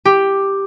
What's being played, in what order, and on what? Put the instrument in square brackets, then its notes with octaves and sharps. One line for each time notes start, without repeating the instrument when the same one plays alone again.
[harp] G4